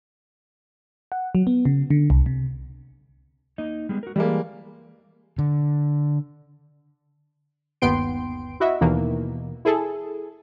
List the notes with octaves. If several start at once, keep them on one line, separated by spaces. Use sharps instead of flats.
F#5
F#3
B3
C#3
D3
C2
C3
A#3 D#4 D#5
G3 G#3 B3
F#4 A#4
E3 G3 G#3 A#3
D3
G1 D#2 B3 G5 C6 D7
E4 F#4 D#5 E5
D#2 B2 D#3 E3 A#3
E4 G#4 A4